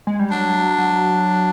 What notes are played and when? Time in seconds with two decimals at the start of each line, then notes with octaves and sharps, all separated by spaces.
0.07 G#3
0.19 G3
0.31 F#3 D4
0.78 F#3